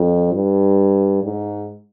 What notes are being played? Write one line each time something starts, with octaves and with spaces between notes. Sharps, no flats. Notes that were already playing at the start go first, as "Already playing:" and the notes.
Already playing: F2
G2
G#2